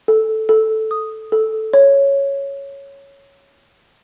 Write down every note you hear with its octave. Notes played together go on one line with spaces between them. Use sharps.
A4
A4
D#6
A4
C#5